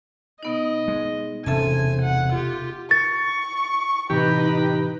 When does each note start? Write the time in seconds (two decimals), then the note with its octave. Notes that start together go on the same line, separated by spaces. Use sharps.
0.43 B2 B3 D#4 D#5
0.88 G#3
1.46 E1 C3 C#4 A4 C5 E5 G#5 A5
2.02 F#5
2.32 F4 G4
2.91 C#6 A6
4.10 A2 C3 E3 D#4 G4 B4